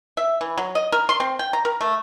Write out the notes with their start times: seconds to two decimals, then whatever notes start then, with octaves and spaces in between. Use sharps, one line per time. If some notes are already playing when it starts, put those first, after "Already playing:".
0.17 E5
0.41 E3
0.58 F#3
0.75 D#5
0.92 A#4
1.09 C6
1.20 C4
1.39 G5
1.53 A#5
1.65 A#4
1.81 A3